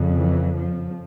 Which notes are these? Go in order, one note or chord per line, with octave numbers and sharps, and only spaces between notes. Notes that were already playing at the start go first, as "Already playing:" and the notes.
Already playing: F2 C#3
E3
F3